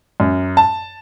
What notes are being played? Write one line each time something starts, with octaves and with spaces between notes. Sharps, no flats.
F#2
A5